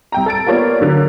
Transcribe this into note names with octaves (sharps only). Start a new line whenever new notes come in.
C2 G5 A#5
A4 A6 D7
A#3 B3 F4 C#5 D5
D3 F#3 A#3